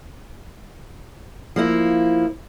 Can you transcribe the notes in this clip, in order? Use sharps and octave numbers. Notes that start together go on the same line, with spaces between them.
F3 A#3 E4